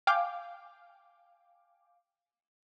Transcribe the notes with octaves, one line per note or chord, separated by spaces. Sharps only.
F5 G5 G#5 D6